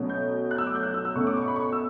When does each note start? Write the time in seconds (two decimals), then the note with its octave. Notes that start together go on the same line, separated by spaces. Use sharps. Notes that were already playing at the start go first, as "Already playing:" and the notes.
Already playing: B2 F#3 A3 C#4
0.09 G6
0.51 F#6
0.58 E6
0.67 D6
0.75 G6
0.83 F#6
0.94 E6
1.05 E6
1.16 B2 A3 C#4 C#6
1.27 D6
1.37 C#6
1.48 B5
1.56 C#6
1.72 E6